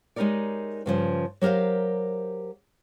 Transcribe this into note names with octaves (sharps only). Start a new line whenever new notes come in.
G#3 D#4 G4 A#4 C#5 D5
G2 C#3 F3
F#3 G4 A#4 C5 F5